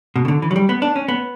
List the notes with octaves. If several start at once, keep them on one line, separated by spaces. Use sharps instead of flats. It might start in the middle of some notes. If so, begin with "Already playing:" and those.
B2
C#3
D3
E3
F#3
G3
B3
D4
C#4
B3